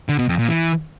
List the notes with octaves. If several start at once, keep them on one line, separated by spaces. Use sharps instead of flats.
D3
B2
F2
A#2
E3